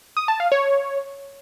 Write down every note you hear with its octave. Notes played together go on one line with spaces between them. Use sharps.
D#6
A5
F5
C#5